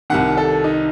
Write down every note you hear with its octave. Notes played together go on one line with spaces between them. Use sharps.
C2 C3 D#3 F#5
A4
D#4